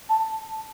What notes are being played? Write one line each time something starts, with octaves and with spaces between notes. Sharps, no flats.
A5